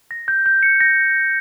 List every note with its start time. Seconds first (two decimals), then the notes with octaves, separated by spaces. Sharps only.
0.11 A#6
0.28 G6
0.46 G6
0.63 C#7
0.80 A#6